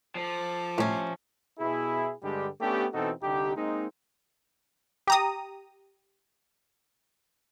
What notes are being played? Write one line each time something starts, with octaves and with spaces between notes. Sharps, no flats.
F3 A4 D6
A2 C3 C#4
B2 E4 G#4
G2 D3 G3 G#3 G4
A3 B3 C#4 D4 G4
B2 E3 C4 D#4 F#4 A4
C2 D3 D#4 G4
G#3 A#3 C4 D#4
G4 A#5 D#6